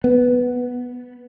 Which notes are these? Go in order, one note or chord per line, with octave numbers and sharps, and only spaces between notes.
B3